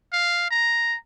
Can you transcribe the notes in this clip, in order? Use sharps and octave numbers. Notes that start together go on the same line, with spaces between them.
F5
A#5